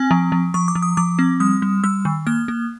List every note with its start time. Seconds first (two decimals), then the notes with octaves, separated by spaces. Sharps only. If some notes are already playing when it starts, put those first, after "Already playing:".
Already playing: C4 G#5
0.11 F3
0.32 F3
0.54 F3 C#6
0.68 D6
0.75 F3
0.82 D#6
0.97 F3 D6
1.19 C4
1.40 G3 D#6
1.62 G3
1.84 G3 E6
2.05 D#3
2.27 A#3 F6
2.48 A#3